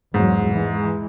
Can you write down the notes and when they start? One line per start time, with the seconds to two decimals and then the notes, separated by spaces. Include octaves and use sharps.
0.14 E2 G#2 F#3
0.50 E3 G#3